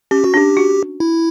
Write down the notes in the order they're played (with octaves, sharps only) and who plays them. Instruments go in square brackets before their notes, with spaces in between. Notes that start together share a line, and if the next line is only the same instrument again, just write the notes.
[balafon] C#4 [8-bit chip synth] G4
[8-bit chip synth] F#4
[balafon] D4 [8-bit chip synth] G4
[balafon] F#4
[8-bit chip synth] E4